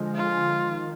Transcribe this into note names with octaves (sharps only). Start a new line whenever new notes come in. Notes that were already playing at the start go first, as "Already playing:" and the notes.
Already playing: D3 F3 G#3
F4
D#3